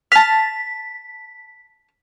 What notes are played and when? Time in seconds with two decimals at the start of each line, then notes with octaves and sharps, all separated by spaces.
0.12 A5 F6 B6